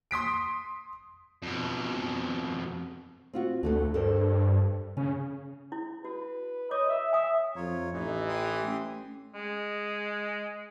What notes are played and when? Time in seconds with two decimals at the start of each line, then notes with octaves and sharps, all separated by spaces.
0.11 C6 D#6 B6 D7
1.43 F2 B2
3.34 C4 F4 F#4
3.63 D2 A3 F#4 A4
3.94 G2 A4 A#4 C5
4.97 C#3 C#4
5.72 E4
6.05 F#4 B4
6.71 C#5 D#5 D6
6.89 E5
7.13 E5 G#5 D#6
7.56 F2 F4 C#5 A#5
7.93 A1 E3 D#4
8.29 G4 C6 D#6
8.63 A3 C#4
9.35 G#3